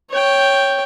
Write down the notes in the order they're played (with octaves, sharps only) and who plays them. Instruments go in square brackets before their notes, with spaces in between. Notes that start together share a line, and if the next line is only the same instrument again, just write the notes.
[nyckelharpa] C#5 G5